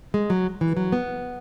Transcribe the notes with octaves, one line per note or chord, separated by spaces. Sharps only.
G#3
F#3
E3
F#3
B3